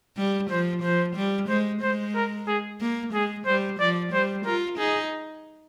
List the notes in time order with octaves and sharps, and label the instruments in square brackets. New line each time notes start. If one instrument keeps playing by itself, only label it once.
[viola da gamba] G3
[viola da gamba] F3 [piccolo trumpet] C5
[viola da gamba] F3 [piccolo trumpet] C5
[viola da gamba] G3
[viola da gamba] G#3 [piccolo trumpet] C5
[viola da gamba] G#3 [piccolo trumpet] C5
[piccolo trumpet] A#4
G#4
[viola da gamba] A#3
[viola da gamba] G#3 [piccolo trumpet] G#4
[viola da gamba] G3 [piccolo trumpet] C5
[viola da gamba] F3 [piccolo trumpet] D5
[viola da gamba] G3 [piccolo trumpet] C5
[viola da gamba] F4 [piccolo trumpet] A#4
[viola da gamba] D#4 [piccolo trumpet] G#4